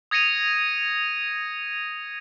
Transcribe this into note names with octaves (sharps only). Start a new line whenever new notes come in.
D#6 G#6 A#6 C#7 D#7 F7